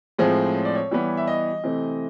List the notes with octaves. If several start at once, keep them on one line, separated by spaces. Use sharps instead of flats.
A2 F3 G#3 C4 G#4
C#5
D5
C#5
E3 G3 B3
E5
D#5
C3 E3 A3 C4